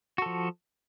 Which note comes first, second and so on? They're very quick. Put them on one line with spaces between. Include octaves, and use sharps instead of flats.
F#4 A4 F3